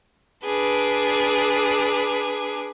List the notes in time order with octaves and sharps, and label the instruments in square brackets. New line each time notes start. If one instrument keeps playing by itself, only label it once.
[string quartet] D4 G#4 B4